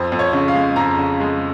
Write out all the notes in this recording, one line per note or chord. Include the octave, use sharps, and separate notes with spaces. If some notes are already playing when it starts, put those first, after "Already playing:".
Already playing: F2 C5
F2
C#5
C#3
F5
G#3
F2 A#5
C#3
G#3